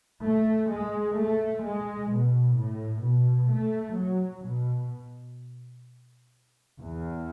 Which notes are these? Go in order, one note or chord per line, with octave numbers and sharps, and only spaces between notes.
A3
G#3
A3
G#3
B2
A2
B2
A3
F#3
B2
E2